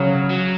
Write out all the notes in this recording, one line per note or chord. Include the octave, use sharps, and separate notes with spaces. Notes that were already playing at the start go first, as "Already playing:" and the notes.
Already playing: C#3 F#3
F#3